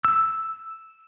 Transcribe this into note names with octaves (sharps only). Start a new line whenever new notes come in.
E6